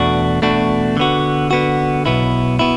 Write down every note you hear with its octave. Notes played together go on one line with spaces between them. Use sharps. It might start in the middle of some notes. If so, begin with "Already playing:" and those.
Already playing: E2 B2 A3 D4 F#4
E2 B2 A3 D4 F#4
D3 B3 F#4
D3 B3 F#4
B1 B2 B3 E4
B2 B3 E4